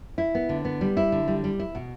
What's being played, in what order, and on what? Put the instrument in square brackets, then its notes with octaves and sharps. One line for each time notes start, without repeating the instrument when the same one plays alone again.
[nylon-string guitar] E4
B3
D3
B3
G3
E4
D3
G3
G3
E4
B2